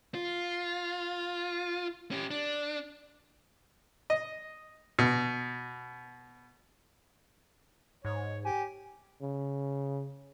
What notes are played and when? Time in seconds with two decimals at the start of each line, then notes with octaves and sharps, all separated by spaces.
0.14 F4
2.11 C#4 G4
2.31 D4
4.10 D#5
4.99 B2
8.05 G#2 C#5
8.45 G4 G#5
9.21 C#3